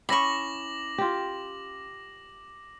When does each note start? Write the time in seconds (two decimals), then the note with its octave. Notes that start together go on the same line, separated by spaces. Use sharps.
0.09 C#4 E4 B5 C#6 D6 A#6 F#7
0.98 F4 G4